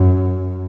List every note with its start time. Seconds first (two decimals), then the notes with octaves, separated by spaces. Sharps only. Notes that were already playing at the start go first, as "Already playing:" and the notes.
Already playing: F#2